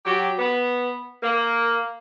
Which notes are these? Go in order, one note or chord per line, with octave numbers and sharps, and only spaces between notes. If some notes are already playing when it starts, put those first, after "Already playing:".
F#3 G4
B3
A#3